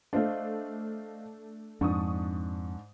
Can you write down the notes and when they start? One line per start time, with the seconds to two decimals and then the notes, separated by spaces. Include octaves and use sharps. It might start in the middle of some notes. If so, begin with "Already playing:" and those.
0.13 A3 D4 C5 D#5 F5
1.81 F2 G#2 D4 C#6 D#6